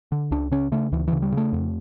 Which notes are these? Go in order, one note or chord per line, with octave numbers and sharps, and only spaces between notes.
D3
C#2 D4
C#3 C#4
C#3 A3
D2 E3
C#3 E3
G3
C#3 A3
F2